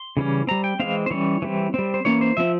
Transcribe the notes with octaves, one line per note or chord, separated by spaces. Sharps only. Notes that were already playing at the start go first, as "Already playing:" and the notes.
Already playing: C6
C#3 E3 G3 C#4
G3 C4 A#5
G5
E3 G#3 C4 F5
C5
E3 G3 C#4 C#5
E3 G3 C4
G3 C4
C5
E3 A#3 C#4 C#5
C5
F3 C4 E5